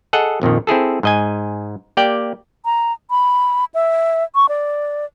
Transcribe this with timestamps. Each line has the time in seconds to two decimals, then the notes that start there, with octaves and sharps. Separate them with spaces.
0.13 G#4 A4 D#5 F#5
0.42 A#1 F2 A#2 D#3
0.67 C4 E4 G#4 A4
1.03 G#2 D#5 G#5
1.97 A#3 G4 D5 G5
2.65 A#5
3.10 B5
3.74 E5
4.35 C#6
4.49 D5